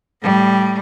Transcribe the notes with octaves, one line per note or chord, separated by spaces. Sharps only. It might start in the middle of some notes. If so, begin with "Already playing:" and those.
A2 G3